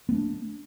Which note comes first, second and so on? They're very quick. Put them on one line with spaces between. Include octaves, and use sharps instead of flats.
B3 A3 D4